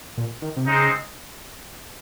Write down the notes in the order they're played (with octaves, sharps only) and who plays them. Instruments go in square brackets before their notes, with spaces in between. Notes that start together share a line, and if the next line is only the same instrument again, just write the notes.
[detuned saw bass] A#2
D#3
C3
[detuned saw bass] C#3 [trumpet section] G#3 C4 D#4